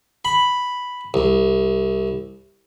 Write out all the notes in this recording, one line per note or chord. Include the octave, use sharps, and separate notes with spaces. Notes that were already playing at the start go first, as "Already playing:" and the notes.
B5
C2